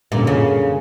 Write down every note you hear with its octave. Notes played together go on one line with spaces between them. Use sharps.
F#2 A#2 D3 G3 A#3
C#3